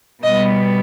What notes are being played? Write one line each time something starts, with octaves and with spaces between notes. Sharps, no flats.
B2 G3 B3 D#5